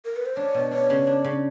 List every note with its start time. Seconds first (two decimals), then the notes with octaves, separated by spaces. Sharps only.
0.05 A#4
0.17 B4
0.26 C5
0.36 D4 C#5
0.54 B2
0.71 D4 C#5
0.90 C#3
1.07 D4
1.24 C#3